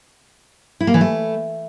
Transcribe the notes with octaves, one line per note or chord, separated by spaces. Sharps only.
E4
A#3
E3
A3